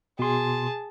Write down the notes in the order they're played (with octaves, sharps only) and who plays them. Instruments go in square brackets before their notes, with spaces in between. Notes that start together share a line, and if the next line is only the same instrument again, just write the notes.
[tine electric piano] B2 C6 [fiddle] G#4 A5